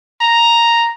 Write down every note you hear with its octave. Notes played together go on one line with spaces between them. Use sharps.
A#5